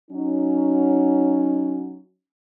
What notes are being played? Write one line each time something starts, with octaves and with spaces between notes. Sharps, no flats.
F#3 C#4 D#4